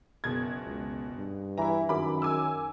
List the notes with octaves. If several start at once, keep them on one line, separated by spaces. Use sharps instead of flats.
F#1 B2 G#6
C#2
G2
E3 E4 A#5
F#2 D#3 B5 D6
G#5 D6 E6